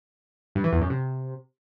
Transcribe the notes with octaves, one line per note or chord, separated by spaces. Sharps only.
G2
E3
E2
F#2
C3